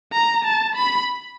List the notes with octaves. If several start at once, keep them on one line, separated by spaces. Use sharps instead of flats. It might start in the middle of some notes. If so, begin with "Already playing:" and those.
A#5
A5
B5